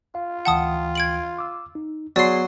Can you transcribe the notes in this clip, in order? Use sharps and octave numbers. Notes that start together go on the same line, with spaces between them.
F4 F5
D2 E3 F#5 G5 A5 D#6
G#6 D7 F#7
D6 E6
D#4
F#3 B3 G#4 D5 C6